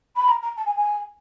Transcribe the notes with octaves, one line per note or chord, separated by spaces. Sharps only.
B5
A#5
A#5
A5
G#5
G#5